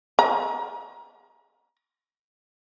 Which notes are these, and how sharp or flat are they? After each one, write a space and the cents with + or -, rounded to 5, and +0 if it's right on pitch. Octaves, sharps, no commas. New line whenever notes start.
A#5 +30